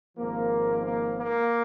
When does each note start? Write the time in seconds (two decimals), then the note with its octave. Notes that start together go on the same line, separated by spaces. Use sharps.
0.18 G#1 G#2 F3 A#3
0.85 A#3
1.19 A#3